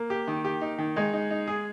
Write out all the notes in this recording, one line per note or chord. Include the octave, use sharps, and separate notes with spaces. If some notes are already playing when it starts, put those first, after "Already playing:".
Already playing: A#3
G4
D#3
G4
D#4
D#3
G#3 D#4
D#4
D#4
G#4